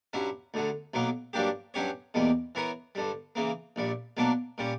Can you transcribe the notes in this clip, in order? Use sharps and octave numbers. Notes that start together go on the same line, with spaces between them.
G2 F#3 C#4 E4
D2 D3 F#3
B1 B2 F#3 A#3
G2 F#3 A#3 D4 G4
G2 F#3 C#4 G4 C#5
E2 B2 G3 A#3
E3 B3 E4 A#4 C#5
G2 D3 G3
C#3 E3 A#3
A#1 A#2 G3
B2 F#3 A#3 D4
A#2 G3 C#4